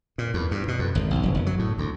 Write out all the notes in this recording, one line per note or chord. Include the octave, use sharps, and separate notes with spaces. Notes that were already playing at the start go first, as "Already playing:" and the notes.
A#2
E2
G2
B2
F2
G#1
B1
F1
F#1
F#3
A2
D2